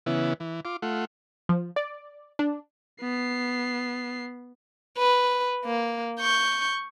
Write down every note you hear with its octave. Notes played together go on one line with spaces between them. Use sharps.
C#3 E3 B3 E4
E3
F4 D6
A3 F4 F#5
F3
D5
D4
B3 C7
B4
A#3
C#6 G6